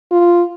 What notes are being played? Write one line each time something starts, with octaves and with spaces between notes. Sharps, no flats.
F4